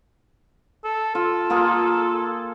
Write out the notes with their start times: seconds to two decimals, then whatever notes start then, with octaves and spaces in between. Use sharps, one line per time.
0.84 A4
1.15 F4 A4
1.50 A#3 F4 G#4